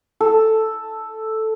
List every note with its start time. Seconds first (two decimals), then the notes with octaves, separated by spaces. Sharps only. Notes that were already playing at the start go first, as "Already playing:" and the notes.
0.21 A4